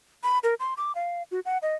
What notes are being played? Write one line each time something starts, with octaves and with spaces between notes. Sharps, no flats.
B5
A#4
C6
D6
F5
F#4
F#5
D#5